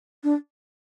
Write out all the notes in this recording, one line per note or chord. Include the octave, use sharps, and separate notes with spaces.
D4